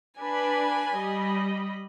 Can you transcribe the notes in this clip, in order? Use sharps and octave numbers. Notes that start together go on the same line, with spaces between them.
D4 B4 G#5 B5
G3 D#5 B5